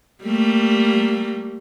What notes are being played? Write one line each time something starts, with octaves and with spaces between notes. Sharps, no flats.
G3 A3 A#3